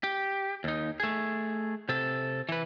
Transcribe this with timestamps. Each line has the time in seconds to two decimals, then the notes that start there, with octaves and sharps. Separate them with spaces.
0.04 G4
0.64 D#2 D#4
1.00 A3 G#4
1.89 C3 A4
2.49 E3 B4